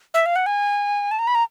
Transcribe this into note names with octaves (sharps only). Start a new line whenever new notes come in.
E5
F5
F#5
G#5
A5
A#5
B5
A#5